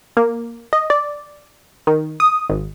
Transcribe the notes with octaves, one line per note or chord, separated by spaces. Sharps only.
A#3
D#5
D5
D#3
D#6
G#1